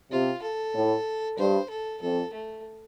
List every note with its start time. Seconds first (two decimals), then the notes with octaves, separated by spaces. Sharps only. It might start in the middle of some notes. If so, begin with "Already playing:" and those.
0.11 C3 F4
0.42 A4
0.74 A2
1.38 G2 C5
1.70 A4
2.02 F2 A4
2.33 A3